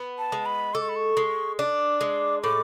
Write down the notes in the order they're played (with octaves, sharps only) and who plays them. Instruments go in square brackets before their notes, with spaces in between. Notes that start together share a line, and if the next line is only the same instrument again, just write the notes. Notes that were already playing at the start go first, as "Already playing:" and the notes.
Already playing: [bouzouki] B3
[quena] A5
[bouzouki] G#3
[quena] B5
[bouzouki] A4 [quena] D6
[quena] C#6
B5
C#6
[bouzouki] G#3
[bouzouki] D4 [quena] D6
[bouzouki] G#3
[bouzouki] A2 [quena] D6